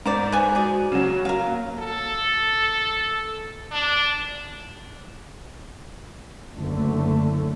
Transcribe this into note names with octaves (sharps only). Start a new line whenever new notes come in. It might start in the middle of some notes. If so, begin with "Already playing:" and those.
G#2 A#4 C5 D5
B3 G#4 C5 G#5
F#4 G#4 D5
C#3 F#3
F#3 A#4 F5
A#3
A4
D4
F#1 D3 A3